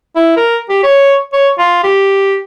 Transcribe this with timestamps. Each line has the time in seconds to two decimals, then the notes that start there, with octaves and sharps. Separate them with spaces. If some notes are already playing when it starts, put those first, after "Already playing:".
0.16 E4
0.37 A#4
0.69 G4
0.83 C#5
1.33 C#5
1.58 F4
1.84 G4